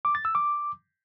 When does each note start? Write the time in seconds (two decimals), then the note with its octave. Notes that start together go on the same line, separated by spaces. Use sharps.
0.05 D6
0.15 A6
0.25 E6
0.35 D6